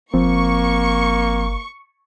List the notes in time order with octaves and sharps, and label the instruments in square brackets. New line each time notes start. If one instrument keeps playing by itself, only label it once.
[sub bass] G1 [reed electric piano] F3 C4 [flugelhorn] A#3 [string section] C#6